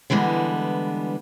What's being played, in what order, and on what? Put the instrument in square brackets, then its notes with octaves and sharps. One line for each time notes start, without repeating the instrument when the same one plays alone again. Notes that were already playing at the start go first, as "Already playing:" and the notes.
[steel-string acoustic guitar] D3 E3 G3 G#3 B3